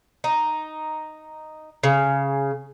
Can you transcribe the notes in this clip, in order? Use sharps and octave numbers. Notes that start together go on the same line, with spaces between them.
D#4
C#3